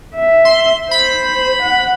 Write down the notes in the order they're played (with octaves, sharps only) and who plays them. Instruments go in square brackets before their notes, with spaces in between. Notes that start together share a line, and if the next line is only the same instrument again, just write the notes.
[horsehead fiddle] E5
[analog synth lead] C6
[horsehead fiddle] C5 [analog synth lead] B5
[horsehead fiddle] F#5